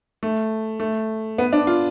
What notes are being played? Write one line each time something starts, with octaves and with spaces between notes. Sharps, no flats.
A3
A3
B3
D4
F4